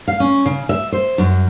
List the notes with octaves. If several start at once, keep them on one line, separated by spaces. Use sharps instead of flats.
F5
C#4
C#3
E5
C5
F#2